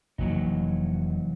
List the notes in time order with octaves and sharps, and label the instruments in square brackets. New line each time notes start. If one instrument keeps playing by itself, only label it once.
[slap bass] F1 A#3 [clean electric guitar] E3 F#3 D#4